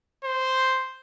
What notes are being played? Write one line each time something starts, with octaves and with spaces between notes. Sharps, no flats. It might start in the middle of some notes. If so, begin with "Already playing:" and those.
C5